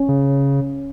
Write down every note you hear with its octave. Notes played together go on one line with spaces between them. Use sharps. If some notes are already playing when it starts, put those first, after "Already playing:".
Already playing: C#4
C#3